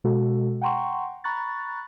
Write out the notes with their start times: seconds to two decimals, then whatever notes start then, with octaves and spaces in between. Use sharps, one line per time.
0.04 B2 G#3 F#4 A4
0.61 F#5 G5 A#5 C6 C#6
1.24 A#5 B5 C#6 F#6 A6